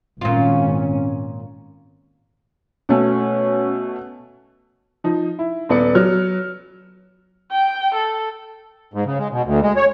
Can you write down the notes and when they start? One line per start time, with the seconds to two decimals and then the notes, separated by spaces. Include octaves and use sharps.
0.21 G#1 A#2 C#4 F4
2.89 B2 A3 C#4
5.04 F3 D#4
5.39 E4
5.69 D#1 B3 D5 C#7
5.95 F#3 F6
7.51 G5
7.94 A4
8.94 G#2
9.06 C#3
9.19 G#3
9.32 B2
9.45 D2
9.62 G#3
9.76 C#5